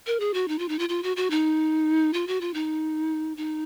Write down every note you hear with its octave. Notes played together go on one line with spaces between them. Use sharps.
A#4
G#4
F#4
D#4
F4
D#4
F4
F4
F#4
F#4
D#4
F4
F#4
F4
D#4
D#4